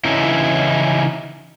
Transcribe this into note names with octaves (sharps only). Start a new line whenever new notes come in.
C#3 E3 C#4 D#4 E4